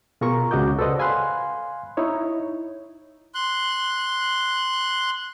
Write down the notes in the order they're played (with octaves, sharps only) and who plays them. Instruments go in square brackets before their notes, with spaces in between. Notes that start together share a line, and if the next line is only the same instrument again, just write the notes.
[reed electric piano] B2 F4 G#4 A#4 A#5 C#6
C#2 C#3 F#4 D#5 D6 G6
A4 B4 C5 D5 D#5 F#5
F5 G#5 B5 C6 F#6
D#4 E4 C#5
[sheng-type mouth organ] C6 F#6